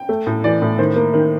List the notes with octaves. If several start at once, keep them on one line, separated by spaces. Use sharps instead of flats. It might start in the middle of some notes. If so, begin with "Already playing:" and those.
Already playing: G5
A3
A2
E3 D5
A2
D#3 C5
A#3
D#3